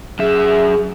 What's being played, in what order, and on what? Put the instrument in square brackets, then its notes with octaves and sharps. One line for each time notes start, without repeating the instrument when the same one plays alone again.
[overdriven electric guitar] F#2 E5 [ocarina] G#4